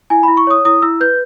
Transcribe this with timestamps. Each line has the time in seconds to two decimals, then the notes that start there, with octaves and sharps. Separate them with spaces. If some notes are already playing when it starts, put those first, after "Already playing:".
0.10 E4 G#5
0.23 E4 B5
0.37 C#6
0.47 C#5 D#6
0.65 E4 D#6
0.82 E4 E6
1.00 B4 G6